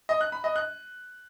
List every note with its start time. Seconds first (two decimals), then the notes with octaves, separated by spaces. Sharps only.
0.09 D#5
0.21 F#6
0.32 B5
0.44 D#5
0.56 F#6